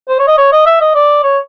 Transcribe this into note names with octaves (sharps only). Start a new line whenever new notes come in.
C5
C#5
D#5
C#5
D#5
E5
D#5
D5
C#5